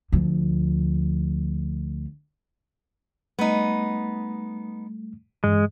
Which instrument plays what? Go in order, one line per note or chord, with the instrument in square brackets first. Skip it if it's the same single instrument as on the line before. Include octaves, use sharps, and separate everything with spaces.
[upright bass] D2 F3
[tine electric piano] G3 A3 [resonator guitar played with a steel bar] B3 D#4
[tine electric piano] G2 E3 [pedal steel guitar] G#3